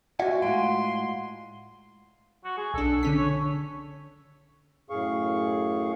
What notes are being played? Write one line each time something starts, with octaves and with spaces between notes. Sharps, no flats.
F4 F#4 D5 E5 F#5 G#5
A2 G#3 F5 F#5 C6
F#4
G#4
B1 D4 A4
D3 C#4 B6
C#5
F#2 A2 G#4 F5 C#6